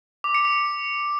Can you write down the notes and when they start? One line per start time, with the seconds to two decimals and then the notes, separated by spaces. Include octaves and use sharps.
0.24 D6
0.35 C#7
0.45 D6